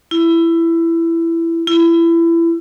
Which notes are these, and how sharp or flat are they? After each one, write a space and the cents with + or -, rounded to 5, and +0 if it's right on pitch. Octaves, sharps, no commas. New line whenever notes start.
E4 +15
E4 +25